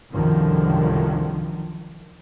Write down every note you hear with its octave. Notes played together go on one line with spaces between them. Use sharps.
C2 F#2 D3 D#3 F3